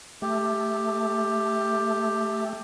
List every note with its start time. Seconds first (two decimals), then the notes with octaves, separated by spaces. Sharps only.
0.22 A3 G4